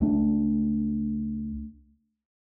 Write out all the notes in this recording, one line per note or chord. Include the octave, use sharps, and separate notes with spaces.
C#2 A3 D4